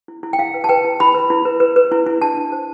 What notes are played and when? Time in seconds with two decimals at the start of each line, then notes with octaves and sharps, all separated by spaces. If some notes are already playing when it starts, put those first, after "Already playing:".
0.08 E4
0.23 E4
0.33 G5
0.38 E4 F5
0.54 B4
0.64 A5
0.69 B4 G5
0.85 E4
1.00 E4 B5
1.15 B4
1.30 E4
1.45 B4
1.60 B4
1.76 B4
1.92 E4
2.07 E4
2.21 D4 A5
2.37 D4
2.52 C5